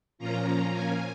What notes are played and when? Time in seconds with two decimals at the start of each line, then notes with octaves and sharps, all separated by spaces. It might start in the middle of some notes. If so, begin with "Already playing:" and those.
0.18 A#2 F3 A#3 C#4 F4 A#5
0.71 G#5